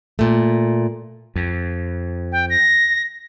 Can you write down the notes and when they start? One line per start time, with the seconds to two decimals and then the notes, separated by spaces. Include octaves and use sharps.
0.19 A#2 A3
1.36 F2
2.32 G5
2.50 A#6